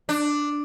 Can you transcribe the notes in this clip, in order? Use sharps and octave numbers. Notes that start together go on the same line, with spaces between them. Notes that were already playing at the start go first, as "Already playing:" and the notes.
D4